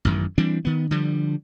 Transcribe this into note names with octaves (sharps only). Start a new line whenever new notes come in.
A1 F#2 D#3
E3 G3 C4 D4
D#3 B3
D3 F3 G3